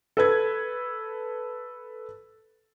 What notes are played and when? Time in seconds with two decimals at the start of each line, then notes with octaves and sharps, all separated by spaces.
0.17 A4 B4 G#6